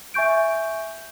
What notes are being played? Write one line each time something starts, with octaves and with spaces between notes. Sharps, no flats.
E5 G#5 C#6 G6 D7